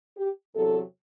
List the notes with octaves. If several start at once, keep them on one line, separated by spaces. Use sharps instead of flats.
G4
E2 C3 F#3 A4